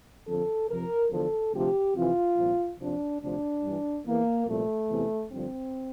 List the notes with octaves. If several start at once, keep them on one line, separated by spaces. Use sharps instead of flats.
F2 D3 F3 A4
F2 C3 F3 A#4
E2 D3 F3 A4
D2 C3 F3 G4
F2 C3 E3 F4
C2 A#2 F3
F2 C3 F3 D4
D2 C3 F3 D4
G2 E3
E2 E3 A#3
C2 A#2 F3 A3
E2 C3 E3
G2 D3 F3 C4